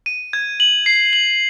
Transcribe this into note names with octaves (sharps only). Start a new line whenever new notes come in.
D#7
G#6
F#7
C7
F#7